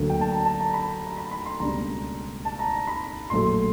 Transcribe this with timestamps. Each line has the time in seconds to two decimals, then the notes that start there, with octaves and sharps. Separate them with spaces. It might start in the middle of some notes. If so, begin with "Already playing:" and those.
Already playing: D2 D3 F#3 A#3
0.10 G5
0.21 A5
0.32 A#5
0.45 A5
0.60 A#5
0.74 B5
1.06 A#5
1.17 B5
1.31 B5
1.46 C6
1.60 C#2 B2 G3 A#3 D4 A#5
2.45 A5
2.59 A#5
2.73 A#5
2.87 B5
3.30 A#1 A2 F#3 A3 C6